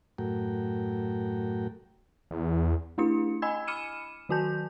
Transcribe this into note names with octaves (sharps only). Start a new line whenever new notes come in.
F#2 A2 A3 F#4 A#4 G5
E2
A3 D4 E4 G4 C#7
D#5 G#5 B5 E6 G#6
B5 D6 F6 C#7 D#7 E7
D#3 F#3 F#4 G#5 A5 G6